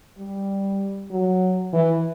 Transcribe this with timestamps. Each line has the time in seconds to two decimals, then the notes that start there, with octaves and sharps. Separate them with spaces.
0.19 G3
1.12 F#3
1.73 E3